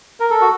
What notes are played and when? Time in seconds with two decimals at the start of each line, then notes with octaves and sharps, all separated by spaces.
0.20 A#4
0.30 A4
0.41 F#4